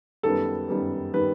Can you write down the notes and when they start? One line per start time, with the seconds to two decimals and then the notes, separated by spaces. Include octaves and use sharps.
0.23 F#2 D#3 G3 B3 A4
0.68 F#2 D#3 G3 B3
1.14 D#3 G3 B3 B4